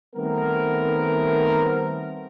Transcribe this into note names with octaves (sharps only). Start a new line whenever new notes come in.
D#3 G3 A3 B3 C4 A#4